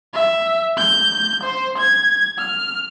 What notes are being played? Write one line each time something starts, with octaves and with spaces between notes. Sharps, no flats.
E5
G6
C5
G#6
F6